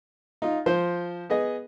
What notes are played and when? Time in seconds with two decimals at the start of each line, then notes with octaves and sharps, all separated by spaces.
0.42 D#4 F4
0.66 F3 C5
1.30 B3 G#4 D#5